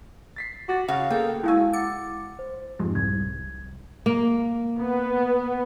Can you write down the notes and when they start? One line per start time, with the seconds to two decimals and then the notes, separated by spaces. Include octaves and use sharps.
0.36 A6 B6 C7
0.69 F#4 D6 A6
0.88 C#3 F#4 F5
1.10 A#3 B3 G#4 A4 G5
1.43 G#3 E4 F#4 F5 G#5 E6
1.73 F#5 D6 A6 C#7
2.39 C5
2.79 F2 G#2 F3 G4
2.95 C2 G#6
4.06 A#3
4.78 B3